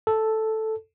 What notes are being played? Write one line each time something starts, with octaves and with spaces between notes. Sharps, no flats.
A4